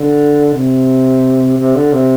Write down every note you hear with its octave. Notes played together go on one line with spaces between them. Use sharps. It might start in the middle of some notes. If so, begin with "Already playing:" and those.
Already playing: D3
C3
C3
D3
C3